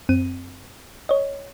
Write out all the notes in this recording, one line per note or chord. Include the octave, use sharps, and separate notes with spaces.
F#2 C4 D#7
C#5 D#5